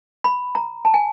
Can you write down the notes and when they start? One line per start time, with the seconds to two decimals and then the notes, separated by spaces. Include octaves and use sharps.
0.24 B5
0.55 A#5
0.85 A5
0.94 G#5